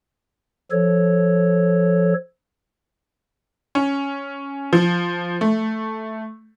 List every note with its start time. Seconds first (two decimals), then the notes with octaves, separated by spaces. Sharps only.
0.71 F3 A4 C#5
3.75 C#4
4.73 F3
5.41 A3